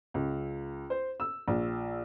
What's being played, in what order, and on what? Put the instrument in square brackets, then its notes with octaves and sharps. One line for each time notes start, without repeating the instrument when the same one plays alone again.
[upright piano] C#2
C5
E6
A#1